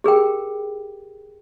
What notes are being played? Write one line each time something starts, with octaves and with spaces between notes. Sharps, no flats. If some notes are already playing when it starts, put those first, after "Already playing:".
G4 G#4 A#4 G5